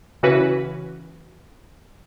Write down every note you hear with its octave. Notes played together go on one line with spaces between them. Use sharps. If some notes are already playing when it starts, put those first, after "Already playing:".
C#3 E3 C#4 F#4 B4